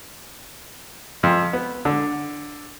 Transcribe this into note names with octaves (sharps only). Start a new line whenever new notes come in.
F2
B3
D3